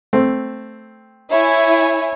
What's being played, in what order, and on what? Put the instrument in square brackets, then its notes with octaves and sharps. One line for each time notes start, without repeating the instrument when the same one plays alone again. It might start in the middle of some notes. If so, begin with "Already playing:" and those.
[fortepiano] A3 C4
[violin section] E4 G#5 [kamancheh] C#5